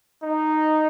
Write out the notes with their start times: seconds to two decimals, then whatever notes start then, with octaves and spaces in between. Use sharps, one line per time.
0.23 D#4